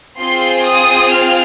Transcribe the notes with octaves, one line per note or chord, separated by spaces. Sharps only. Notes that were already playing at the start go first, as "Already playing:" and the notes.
C4 F4 G#4 C6
D#6
F6